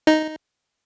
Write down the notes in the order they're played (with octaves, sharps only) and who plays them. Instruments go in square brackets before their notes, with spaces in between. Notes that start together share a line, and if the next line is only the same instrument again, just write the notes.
[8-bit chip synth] D#4